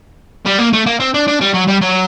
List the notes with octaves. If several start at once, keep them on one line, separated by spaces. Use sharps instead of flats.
G3
A#3
A3
A#3
C4
D4
D4
G3
F#3
G3
F#3